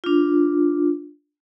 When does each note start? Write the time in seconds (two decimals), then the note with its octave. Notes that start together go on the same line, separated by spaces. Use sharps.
0.04 D4 F4